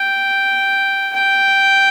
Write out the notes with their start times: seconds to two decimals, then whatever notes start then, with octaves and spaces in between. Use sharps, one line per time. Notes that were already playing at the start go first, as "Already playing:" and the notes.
Already playing: G5
1.13 G5